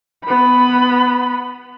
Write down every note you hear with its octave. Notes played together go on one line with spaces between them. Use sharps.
B3 B5